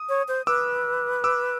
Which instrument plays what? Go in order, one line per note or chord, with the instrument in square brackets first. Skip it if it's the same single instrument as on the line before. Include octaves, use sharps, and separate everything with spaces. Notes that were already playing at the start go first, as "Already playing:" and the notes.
Already playing: [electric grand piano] D#6
[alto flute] C#5
C5
[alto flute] B4 [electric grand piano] D6 E6
[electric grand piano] D6 E6